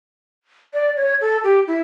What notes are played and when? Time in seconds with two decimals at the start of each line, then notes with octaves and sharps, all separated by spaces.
0.74 D5
0.97 C#5
1.21 A4
1.44 G4
1.67 E4